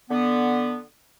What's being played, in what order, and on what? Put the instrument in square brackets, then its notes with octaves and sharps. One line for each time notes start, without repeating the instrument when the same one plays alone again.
[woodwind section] D3 B3